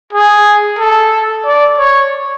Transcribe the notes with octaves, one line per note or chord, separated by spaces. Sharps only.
G#4
A4
D5
C#5